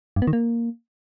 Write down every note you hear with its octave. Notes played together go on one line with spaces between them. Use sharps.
G2
B3
D#3
A#3